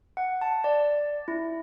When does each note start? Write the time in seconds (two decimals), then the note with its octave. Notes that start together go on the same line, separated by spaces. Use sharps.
0.17 F#5
0.41 A5
0.64 D5
0.80 D5
1.28 E4